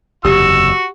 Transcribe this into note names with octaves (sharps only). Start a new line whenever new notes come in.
F#1 E2 C3 F#4 G4 E6